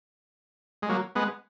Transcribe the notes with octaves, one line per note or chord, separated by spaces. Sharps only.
G#3
F#3 A#3
G#3 B3